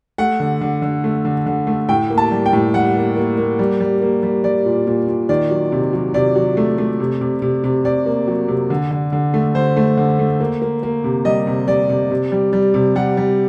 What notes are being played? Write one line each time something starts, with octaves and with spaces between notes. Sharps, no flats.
A3 F#5
D3
D3
D3
A3
D3
D3
A3
A2 G5
A#3
A5
G3
G5
A2
G3 F#5
A#3
A#3
A#3
G3
G3
A#3
G3
G3 D5
A#2
A#2
A#2
D#3 D5
F#3
C3
F#3
C3 D5
F#3
A3
A3
C3
C3
C3
C3
C3 D5
A#3
F#3
C3
D3
D3
D3
A3
D3 C5
A3
D3
A3
A#3
A#3
A#3
C3
G3 D#5
C3
G3 D5
C3
C3
G3
G3
C3
G3 F#5
G3